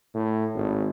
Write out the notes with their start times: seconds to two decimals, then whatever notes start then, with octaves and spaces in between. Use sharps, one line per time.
0.15 A2
0.55 G#1